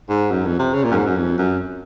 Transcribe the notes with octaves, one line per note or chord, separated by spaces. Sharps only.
G#2
F#2
F2
C3
C#3
A#2
F#2
G#2
F#2
F2
F#2